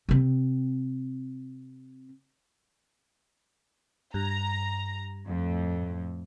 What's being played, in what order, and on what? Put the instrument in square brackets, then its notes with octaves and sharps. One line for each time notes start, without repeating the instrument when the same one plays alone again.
[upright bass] C3 C4
[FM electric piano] G2 [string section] A#5
[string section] F2 A2